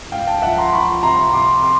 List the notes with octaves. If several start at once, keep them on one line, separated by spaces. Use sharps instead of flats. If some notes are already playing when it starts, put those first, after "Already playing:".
C#2 F5 G5
G5 A5
F3 E5 F#5
A#5 C6
F3 B5 C#6
C3 A#5 C6
C3 C6 D6
C6 D6